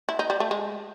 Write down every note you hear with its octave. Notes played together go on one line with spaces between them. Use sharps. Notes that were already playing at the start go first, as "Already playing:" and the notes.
E4
D#4
G3
A3
G#3